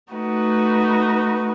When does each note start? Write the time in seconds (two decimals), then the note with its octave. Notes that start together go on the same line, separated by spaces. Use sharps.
0.13 A3 D#4 F#4 B4